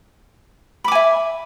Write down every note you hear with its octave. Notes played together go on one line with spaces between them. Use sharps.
E5 G#5 B5 D6